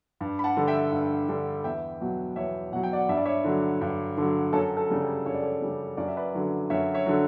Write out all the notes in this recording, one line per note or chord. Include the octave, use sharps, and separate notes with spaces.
G2
B5
F#5 A5
D3 G3
E5 G5
G2
D3 G3
E2 E5 G5
B2 F#3
E2 C#5 E5
B2 F#3 F#5
G5
D5 F#5
G2 E5
D5
C#5 E5
D3 F#3
G2
D3 F#3
F#2 A4 C#5
A4
C#3 G3
G4
F#2 C#5
D5
A4 C#5
C#3 G3
F#2 D5
E5
B4 D5
D3 F#3
F#2 C#5 E5
C#5 E5
D3 F#3